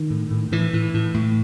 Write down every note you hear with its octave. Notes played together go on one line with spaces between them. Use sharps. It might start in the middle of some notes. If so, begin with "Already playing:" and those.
Already playing: D#3
A2
A2
A2 E3
A2
A2
A2